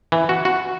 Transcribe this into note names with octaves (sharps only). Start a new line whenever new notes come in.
E3
F#4
F#4